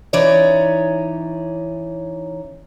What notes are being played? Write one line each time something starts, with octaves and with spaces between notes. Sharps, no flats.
E3 C#4 D#4 C#5 D5